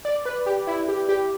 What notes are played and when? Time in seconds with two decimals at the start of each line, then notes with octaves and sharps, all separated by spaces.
0.05 D5
0.25 B4
0.46 G4
0.67 E4
0.88 G4
1.09 G4